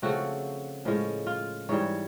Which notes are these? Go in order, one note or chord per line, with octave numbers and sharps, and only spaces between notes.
C#3 F3 A3 C4 F#4
A2 F3 G#3 C#4
F4
G#2 E3 G3 C#5